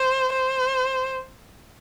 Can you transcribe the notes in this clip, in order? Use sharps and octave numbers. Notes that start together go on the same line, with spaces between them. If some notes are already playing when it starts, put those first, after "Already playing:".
Already playing: C5
C5